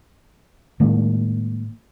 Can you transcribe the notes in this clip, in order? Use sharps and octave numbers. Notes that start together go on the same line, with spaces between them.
A2 D#3 G#3 A#3